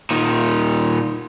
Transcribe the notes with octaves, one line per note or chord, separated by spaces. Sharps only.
A#2 D#3